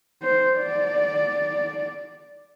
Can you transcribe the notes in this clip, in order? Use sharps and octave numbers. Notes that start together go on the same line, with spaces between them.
C5
D5